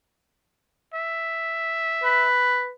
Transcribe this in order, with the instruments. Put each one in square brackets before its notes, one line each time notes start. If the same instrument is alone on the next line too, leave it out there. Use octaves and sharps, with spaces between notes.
[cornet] E5
[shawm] B4